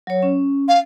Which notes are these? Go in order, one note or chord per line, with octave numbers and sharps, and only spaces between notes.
F#3 C#5
C#4
F5